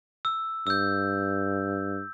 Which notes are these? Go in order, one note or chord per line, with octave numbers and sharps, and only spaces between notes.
E6
G2 E6 G6